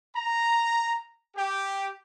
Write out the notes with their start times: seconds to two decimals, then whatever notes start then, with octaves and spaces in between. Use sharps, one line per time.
0.16 A#5
1.36 G4